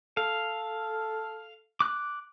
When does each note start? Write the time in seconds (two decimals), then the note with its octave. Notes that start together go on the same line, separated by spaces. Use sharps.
0.17 A4 F5
1.80 D6 F#6